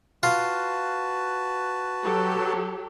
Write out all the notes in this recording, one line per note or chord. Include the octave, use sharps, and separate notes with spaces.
F4 F#4 B4 A5
F#3 G4 A4